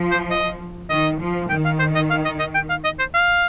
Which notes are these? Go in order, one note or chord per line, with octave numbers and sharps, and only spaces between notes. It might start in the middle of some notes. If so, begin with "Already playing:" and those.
Already playing: F3
C5
D#5
D#3 D#5
F3
D#3 G5
F5
C5
D#5
F5
D#5
D#5
G5
F5
D#5
C5
F5